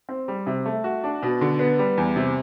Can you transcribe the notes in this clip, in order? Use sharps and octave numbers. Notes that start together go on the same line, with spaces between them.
C4
G3
C3
A3
F#4
D4
B2
D3
B3
G3
E2
C3